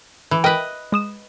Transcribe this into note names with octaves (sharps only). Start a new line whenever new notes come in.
E3
A#4 B4 D#5 G5
G#3 D#6 E7